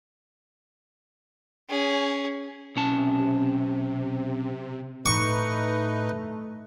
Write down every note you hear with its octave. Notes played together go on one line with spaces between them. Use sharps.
C#4 G#4
B1 C3 C#4 A5
A2 A3 D#4 B4 D#5 C#6